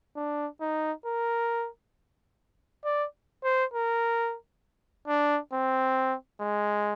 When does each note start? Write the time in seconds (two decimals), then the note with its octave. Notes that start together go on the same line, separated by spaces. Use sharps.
0.16 D4
0.61 D#4
1.06 A#4
2.85 D5
3.44 C5
3.74 A#4
5.08 D4
5.53 C4
6.41 G#3